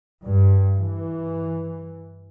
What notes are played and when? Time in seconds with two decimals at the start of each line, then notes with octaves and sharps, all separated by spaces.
0.25 G2
0.78 E3